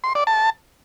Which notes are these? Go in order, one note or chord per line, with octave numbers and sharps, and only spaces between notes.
C6
D5
A5